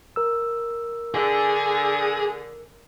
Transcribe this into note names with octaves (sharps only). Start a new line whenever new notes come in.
A#4 E6
D3 G#4